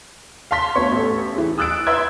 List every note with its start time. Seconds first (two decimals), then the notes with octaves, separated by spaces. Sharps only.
0.51 F5 A5 C6 B6
0.75 D2 B3 C#5 C#6
0.92 A1 A4
1.34 E3 G#4
1.58 D#6 E6 F#6 A6 D7
1.87 B4 E5 C6 E6 G#6